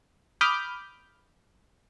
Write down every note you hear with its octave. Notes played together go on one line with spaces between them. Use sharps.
B5 D6 D#6 F6 G6